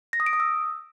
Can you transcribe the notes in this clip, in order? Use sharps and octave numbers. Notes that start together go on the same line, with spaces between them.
A#6
D#6
D7
D#6
E6